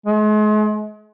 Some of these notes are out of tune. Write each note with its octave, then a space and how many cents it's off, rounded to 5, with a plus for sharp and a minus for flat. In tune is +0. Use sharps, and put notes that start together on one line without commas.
G#3 +40